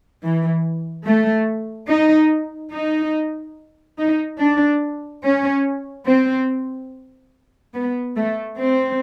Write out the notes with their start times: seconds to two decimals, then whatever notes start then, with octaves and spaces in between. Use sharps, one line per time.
0.22 E3
1.05 A3
1.90 D#4
2.72 D#4
3.98 D#4
4.39 D4
5.24 C#4
6.06 C4
7.74 B3
8.16 A3
8.57 C4